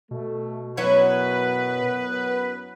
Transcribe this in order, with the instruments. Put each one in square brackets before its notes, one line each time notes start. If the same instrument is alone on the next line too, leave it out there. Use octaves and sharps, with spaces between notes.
[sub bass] B2 [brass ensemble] A3
[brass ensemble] F#2 B3 F#5 [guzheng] F#3 E4 C#5 [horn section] B4